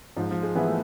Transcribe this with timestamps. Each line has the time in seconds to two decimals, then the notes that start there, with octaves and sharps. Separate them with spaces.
0.16 G#2 F3
0.31 F3
0.43 G#3
0.55 E3 B3 E4 G#4
0.67 A3